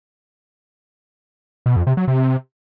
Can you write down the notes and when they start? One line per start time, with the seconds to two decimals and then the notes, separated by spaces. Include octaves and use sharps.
1.66 B2
1.76 F2
1.87 C3
1.97 F#3
2.08 C3